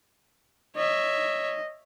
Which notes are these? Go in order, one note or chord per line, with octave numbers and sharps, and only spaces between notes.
C#5 D#5 E5